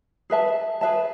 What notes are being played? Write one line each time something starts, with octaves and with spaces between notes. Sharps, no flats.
G#4 B4 E5 A5
G#4 B4 E5 A5